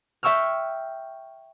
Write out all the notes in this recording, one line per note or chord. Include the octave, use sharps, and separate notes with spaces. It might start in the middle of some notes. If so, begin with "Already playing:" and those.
E5 G5 C#6 E6 F6